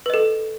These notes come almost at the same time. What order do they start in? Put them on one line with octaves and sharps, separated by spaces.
B4 D#5 A4